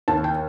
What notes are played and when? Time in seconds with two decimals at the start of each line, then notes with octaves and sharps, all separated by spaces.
0.08 D#2 A5
0.24 G5